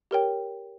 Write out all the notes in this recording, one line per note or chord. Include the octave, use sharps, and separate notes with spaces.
G4 A#4 C#5 G5